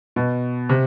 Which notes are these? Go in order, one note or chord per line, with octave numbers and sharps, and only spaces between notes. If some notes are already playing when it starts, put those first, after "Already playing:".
B2
C3